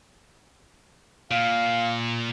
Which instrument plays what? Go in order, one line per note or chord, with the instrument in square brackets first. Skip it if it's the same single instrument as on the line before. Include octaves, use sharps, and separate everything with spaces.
[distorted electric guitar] A#2 [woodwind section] F5